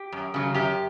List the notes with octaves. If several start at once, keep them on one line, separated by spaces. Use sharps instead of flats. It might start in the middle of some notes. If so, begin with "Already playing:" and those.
Already playing: G4
F#2
C#3 F#3
F#2 G4